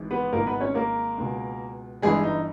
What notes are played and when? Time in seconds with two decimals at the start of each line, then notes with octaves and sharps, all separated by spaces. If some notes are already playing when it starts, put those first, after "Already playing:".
Already playing: G#1 G#2 E3
0.11 B3 B4
0.32 G#1 G#2 D#3 A#3 A#4
0.47 B3 B4
0.60 C#4 C#5
0.74 A#3 A#4
1.18 C#2 B2
2.02 G1 G2 E3 G#3 G#4
2.24 D#4